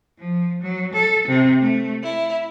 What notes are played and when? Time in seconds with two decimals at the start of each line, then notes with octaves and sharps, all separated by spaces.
0.18 F3
0.61 F#3
0.93 A4
1.27 C3
1.60 A3
2.02 E4